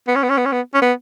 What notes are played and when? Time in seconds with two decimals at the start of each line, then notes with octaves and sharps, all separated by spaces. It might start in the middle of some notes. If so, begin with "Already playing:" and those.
0.07 B3
0.15 C#4
0.23 B3
0.30 C#4
0.37 B3
0.45 C#4
0.52 B3
0.74 C#4
0.82 B3